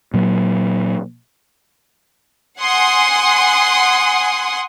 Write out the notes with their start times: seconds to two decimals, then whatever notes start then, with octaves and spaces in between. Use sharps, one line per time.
0.14 A#2 F#3
2.58 F#5 G#5 C6 D#6